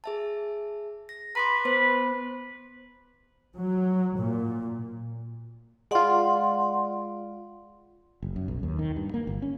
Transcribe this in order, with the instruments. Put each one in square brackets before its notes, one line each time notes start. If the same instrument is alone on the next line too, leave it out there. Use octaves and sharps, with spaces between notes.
[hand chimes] G#4 E5 A5
A#6
[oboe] B4 [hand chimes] A#5 C6 D6
[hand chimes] B3 C5 [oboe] B4
[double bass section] F#3
A#2
[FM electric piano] G#3 F4 [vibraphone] D5 F#5 C6
[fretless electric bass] F#1
F#2
B1
D#2
D#3
G2
A#3
G1
C#4